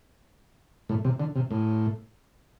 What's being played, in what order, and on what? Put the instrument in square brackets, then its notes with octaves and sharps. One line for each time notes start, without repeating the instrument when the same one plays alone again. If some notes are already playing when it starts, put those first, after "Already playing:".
[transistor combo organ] A2
C3
D3
C3
A2